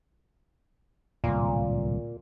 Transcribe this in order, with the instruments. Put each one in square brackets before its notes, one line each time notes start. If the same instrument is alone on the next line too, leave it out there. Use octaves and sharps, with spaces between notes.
[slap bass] D1 C2 [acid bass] A#2